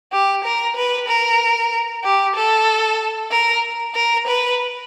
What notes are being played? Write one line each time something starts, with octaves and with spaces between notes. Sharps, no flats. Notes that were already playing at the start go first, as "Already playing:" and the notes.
G4
A#4
B4
A#4
G4
A4
A#4
A#4
B4